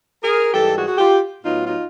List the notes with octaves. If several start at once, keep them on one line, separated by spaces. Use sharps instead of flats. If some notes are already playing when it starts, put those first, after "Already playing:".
G#4 A#4
G#2 E3 G3 G4 A4
F#4 G#4
F#4
F4 G4
A2 F#3 B3 D#4 F4
D#4 F4